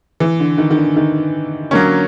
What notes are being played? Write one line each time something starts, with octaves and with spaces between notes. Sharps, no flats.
E3
D3
D#3
D#3
D3
D#3
D3 F#3 A#3 C#4